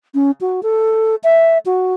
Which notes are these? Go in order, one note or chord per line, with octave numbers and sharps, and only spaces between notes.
C#4
F#4
A4
E5
F#4